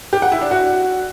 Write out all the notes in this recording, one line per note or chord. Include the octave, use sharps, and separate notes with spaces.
G4
F#5
E4
D4
F#4